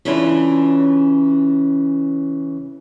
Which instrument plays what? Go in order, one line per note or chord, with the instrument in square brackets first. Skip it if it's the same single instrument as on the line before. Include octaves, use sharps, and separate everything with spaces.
[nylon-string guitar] C#3 E3 C#4 D4 E4 F4